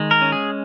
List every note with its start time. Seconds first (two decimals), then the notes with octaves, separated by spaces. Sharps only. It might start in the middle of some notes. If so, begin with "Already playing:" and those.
Already playing: D#3 G#3
0.11 A#4
0.22 C#4
0.32 G#4